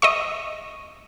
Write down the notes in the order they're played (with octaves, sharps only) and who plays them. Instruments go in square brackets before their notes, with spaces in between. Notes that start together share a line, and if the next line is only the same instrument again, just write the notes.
[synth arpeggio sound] D#5 E5 C#6